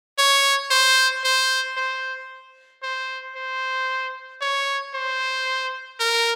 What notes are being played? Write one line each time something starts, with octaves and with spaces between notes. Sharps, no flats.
C#5
C5
C5
C5
C5
C5
C#5
C5
A#4